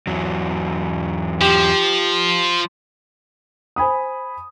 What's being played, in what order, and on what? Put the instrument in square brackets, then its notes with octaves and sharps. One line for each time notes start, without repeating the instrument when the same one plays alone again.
[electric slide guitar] E2 F#3
[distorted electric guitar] F3 [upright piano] G4
[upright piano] C5 G#5 B5 D#6